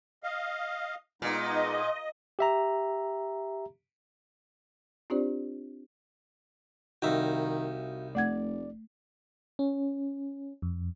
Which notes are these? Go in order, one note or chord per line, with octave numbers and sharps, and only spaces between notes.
D#5 F5
A#2 G#3 B3 D#4 D#5
G4 E5 A#5
C4 D4 F4 G4 C5 D5
C2 D#3 D#4 F#4 E5 F5 G5
F1 A3 D5 F#5 G#6
C#4
F2